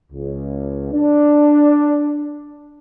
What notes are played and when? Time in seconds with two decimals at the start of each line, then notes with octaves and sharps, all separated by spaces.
0.13 C#2
0.93 D4